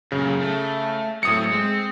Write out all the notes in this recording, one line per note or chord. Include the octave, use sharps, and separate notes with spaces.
F#2 A#2 C#3
A3
A2 F#3 C4 D#6 C#7
G#3 C4